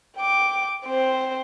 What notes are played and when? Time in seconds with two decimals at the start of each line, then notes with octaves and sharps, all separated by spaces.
0.17 G5 D6
0.85 C4 C5